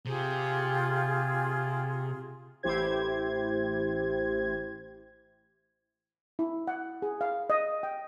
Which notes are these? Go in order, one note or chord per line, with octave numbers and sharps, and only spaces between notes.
C3 F4 G4 G#4
A1 E4 G4 C5 G#6
E4
F#5
G#4
F5
D#5
G5